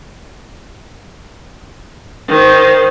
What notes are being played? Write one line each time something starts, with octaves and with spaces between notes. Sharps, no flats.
D#3 C5